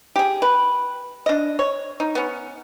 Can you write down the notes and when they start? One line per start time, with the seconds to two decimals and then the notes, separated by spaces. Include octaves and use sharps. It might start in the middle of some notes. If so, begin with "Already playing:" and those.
0.16 G4 G#4
0.42 B4
1.26 D4 D#5
1.59 C#5
2.00 D#4
2.15 B3 C#4